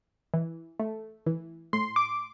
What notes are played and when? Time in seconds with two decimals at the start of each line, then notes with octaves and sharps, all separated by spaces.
0.34 E3
0.79 A3
1.26 E3
1.73 A2 C6
1.96 D6